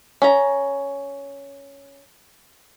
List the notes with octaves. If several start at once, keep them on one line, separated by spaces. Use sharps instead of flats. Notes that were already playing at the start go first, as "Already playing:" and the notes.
C#4 A#5